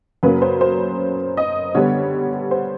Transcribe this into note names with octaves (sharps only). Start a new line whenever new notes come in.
F#2 C#3 F#3 A#3 B4
C5
C5
D#5
D3 G3 B3 C#5
C5